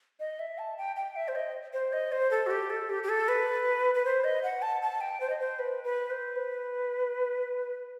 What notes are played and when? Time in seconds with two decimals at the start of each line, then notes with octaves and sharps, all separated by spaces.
0.20 D#5
0.39 E5
0.58 A5
0.78 G5
0.96 G5
1.16 E5
1.28 C5
1.35 D#5
1.73 C5
1.93 D#5
2.12 C5
2.31 A4
2.47 F#4
2.51 G4
2.70 A4
2.90 G4
3.04 G4
3.09 A4
3.28 B4
3.95 B4
4.05 C5
4.24 D#5
4.43 F#5
4.62 A5
4.82 A5
5.01 G5
5.20 C5
5.30 D#5
5.39 C5
5.59 B4
5.84 B4
6.10 C5
6.36 B4